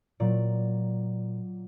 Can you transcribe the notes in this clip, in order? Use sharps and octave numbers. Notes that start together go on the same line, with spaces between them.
A#2 F#3 D5